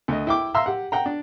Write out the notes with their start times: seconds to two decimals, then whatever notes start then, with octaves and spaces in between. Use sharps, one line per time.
0.08 D2 D#5
0.27 E4 G5 D6
0.54 E5 F5 A#5 C6 E6
0.66 G4 F#5
0.92 F#5 G5 A#5
1.06 D4